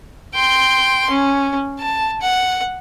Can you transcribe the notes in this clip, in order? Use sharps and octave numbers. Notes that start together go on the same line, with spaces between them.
G5 C6
C#4
A5
F#5